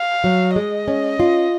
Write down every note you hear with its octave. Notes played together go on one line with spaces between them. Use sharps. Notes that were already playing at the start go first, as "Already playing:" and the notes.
Already playing: F5
F#3
G#3 D#5
C#4
F4